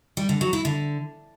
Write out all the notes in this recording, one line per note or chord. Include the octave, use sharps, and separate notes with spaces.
G3
D3
F#3
E4
D3